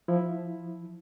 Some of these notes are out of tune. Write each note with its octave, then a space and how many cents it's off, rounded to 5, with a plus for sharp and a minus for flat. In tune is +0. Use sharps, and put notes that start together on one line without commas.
F3 +0 E4 +0